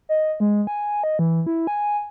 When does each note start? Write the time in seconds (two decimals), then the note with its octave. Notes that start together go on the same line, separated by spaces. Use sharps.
0.09 D#5
0.40 G#3
0.67 G#5
1.04 D#5
1.19 E3
1.47 E4
1.67 G#5